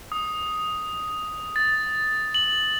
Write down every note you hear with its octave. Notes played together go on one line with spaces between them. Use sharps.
D#6
A6
F#7